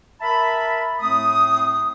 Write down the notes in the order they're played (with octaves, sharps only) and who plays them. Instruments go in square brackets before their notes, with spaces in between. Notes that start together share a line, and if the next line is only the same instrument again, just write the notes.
[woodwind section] A#4 E5 A5 B5
A2 A3 C4 D#6